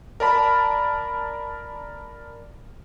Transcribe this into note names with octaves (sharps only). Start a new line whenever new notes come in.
A#4 D5 A5 B5